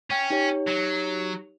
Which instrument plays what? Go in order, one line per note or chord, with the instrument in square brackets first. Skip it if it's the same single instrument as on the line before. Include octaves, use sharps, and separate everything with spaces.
[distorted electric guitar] C#4 [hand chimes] G5 C#6
[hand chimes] D#4 G4 C#5
[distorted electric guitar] F#3